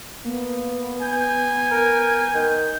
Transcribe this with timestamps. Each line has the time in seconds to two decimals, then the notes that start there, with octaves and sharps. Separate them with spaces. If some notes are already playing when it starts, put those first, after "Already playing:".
0.24 A#3 B3
1.01 G#5 G6
1.71 A#4
2.34 D#3